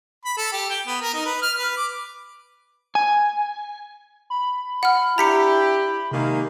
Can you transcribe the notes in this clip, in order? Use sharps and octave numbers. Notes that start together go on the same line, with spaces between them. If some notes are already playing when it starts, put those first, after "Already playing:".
B5
A4
G4
G5
B3
A#4
D#4
B4
F6
B4
D6
G#5
B5
F#5 F6
D4 E4 G4 A#5 B6 C#7
C3 D#3 G#3 A#3